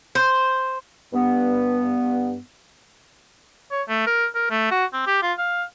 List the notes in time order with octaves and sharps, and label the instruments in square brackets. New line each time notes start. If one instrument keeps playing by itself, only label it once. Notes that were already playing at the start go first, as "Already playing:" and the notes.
[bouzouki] C5
[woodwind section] G2 B3
[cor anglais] C#5
A3
A#4
A#4
A3
F#4
C4
G4
F4
F5